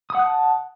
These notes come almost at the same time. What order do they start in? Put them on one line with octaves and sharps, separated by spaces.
D#6 F#5 F#6 A5